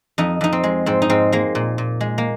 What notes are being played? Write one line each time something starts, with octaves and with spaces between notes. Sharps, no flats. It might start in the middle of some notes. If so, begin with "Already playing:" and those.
F2 D#4
F2 D#4
C4
G#3
G#2 C4
D#4
G#2 C4
G#3 A#3
A#2
A#2
G#3
A#3